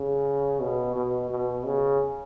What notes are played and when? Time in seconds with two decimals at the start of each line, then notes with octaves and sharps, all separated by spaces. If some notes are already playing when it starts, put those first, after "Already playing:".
Already playing: C#3
0.60 B2
0.95 B2
1.30 B2
1.65 C#3